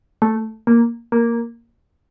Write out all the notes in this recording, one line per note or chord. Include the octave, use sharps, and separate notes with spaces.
A3
A#3
A#3